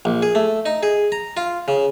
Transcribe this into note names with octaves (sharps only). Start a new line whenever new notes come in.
A#1
G#4
A3
D#4
G#4
A#5
F4
C#3